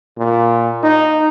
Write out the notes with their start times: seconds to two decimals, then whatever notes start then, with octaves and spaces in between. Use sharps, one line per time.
0.18 A#2
0.83 D#4